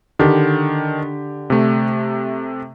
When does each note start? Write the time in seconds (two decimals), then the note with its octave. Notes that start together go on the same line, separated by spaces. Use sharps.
0.19 D3 D#3 D4 G4
1.50 C3 A3